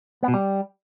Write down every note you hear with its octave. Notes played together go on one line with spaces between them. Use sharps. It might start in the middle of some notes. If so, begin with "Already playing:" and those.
B3
B2
G3